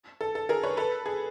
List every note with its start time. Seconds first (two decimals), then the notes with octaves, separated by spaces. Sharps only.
0.21 A4
0.35 A4
0.49 G#4 A#4
0.63 B4 C#5
0.77 A4 B4
1.06 G#4